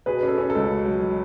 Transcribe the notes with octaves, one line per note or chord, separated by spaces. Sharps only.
B2 G#4 B4
C#4 A4
C#4
A4
C#2
B2
F#3
F#3